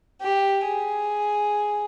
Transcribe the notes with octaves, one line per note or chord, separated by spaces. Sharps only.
G4
G#4